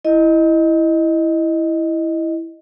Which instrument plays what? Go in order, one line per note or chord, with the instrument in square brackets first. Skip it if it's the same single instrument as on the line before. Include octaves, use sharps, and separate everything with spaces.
[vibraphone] E4 D#5